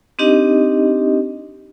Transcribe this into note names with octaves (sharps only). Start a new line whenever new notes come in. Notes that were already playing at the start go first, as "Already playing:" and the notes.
C4 D4 D#4 G4 D#5